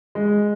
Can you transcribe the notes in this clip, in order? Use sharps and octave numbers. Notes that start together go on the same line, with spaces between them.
G#3